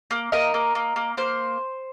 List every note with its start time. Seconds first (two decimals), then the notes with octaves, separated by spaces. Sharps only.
0.11 A#3
0.32 A#3 A#4 D#5
0.54 A#3
0.75 A#3
0.96 A#3
1.17 A#3 C5